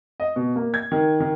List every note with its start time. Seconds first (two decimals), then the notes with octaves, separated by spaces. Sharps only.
0.20 D#5
0.36 B2
0.56 A#3
0.74 G#6
0.92 D#3
1.20 D#3